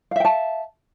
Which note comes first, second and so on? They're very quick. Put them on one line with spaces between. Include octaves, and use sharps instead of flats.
F5 E5 G5 A5